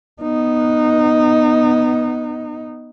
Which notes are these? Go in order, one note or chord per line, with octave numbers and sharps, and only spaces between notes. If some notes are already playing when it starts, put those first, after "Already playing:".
B3 D#4